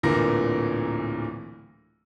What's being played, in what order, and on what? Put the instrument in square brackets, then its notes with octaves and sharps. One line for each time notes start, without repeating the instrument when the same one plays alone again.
[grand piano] D1 A#2 D3 E3 A#4 A#6